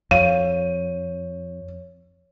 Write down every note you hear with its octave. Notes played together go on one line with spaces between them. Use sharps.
F2 C#5 F5 D#7